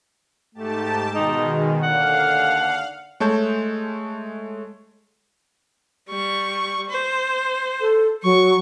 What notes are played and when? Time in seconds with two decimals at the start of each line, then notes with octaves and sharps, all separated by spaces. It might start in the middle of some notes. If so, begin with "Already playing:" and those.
0.55 G#2 A3 G4 A5
1.13 B2 D#3 G#3 D#4
1.83 D#2 D3 D5 F5 F#5
3.20 G#3 A3 C#5 A5 G6
6.09 G3 C#6
6.90 C5
7.81 A4
8.24 F#3 C#6